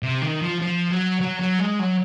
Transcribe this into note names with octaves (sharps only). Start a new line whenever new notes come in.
C3
D#3
F3
F3
F#3
F#3
F#3
G#3
F#3